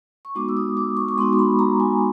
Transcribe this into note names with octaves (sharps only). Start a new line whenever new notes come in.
C#6
G#3 B3 D#4 F#4 D6
E6
D#6
D6
C#6
C#6
G#3 B3 D#4 F#4 C6
C6
B5
A#5
G#5